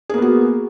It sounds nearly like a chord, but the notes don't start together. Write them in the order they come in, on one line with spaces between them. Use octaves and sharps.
G#4 A#3 B3 F#4